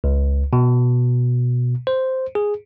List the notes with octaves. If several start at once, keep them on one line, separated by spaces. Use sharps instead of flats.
C#2
B2
C5
G#4